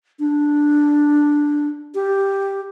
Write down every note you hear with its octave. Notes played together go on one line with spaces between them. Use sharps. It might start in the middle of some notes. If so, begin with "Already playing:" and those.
D4
G4